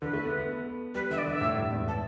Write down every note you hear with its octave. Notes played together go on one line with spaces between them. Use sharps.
D3 B4
A3
B3
B3
G3 B4
D3 E5
D5
D3 E5
A2
G2
E2
A5